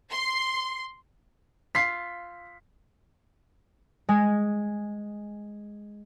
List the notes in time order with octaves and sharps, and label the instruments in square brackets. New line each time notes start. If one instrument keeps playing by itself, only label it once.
[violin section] C6
[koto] F4 [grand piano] B6 C7
[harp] G#3 G#5